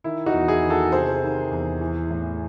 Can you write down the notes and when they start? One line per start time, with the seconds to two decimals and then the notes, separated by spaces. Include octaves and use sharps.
0.04 D#3 E4
0.26 D#4 F#4
0.33 E2
0.48 E4 G#4
0.63 D#3
0.70 F#4 A4
0.92 C3 G#4 C5
1.22 D#3
1.51 E2
1.81 E3
2.11 A2